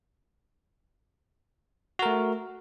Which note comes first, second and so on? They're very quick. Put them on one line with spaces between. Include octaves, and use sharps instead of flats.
F#4 A#4 A3